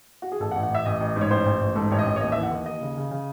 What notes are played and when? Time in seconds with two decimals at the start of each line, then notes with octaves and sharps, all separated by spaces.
0.22 F#4
0.32 G#4
0.40 A1 A4
0.51 F#5
0.55 A1
0.63 F#5
0.70 A1 E5
0.86 A1 D#5
1.01 A1
1.16 G#2
1.21 C#5
1.31 A1 C5
1.46 A1
1.61 A1
1.75 G#2 A4
1.91 A1 C#5
1.99 D#5
2.06 A1
2.16 C#5
2.21 D#2 D#5
2.32 E3 E5
2.43 F#5
2.51 D#2 D#5
2.66 D#2 D#5
2.81 C#3
2.97 C#3
3.11 C#3